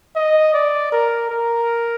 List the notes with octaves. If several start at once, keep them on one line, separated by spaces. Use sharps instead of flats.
D#5
D5
A#4
A#4